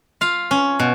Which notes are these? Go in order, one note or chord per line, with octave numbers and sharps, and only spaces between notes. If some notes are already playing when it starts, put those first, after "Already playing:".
F4 F5
C#4
B2